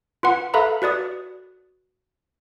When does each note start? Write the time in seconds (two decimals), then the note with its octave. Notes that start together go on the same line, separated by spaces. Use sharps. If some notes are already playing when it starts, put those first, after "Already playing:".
0.23 F4 B4 F#5
0.54 A4 B4 E5 F5 A#5 B5
0.82 F#4 B4 D5 D#6